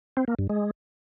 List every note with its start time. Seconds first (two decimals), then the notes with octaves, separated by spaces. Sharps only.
0.17 C4
0.28 A#3
0.39 G2
0.49 G#3